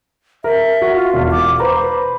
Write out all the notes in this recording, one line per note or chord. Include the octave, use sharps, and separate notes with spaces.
A#4 E5
F#4
F4
E1
D6
B4 C5 A#5 B5